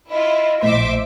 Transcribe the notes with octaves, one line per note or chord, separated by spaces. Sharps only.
E4 F4 D#5
A#1 A2 C5 E5 C6 D6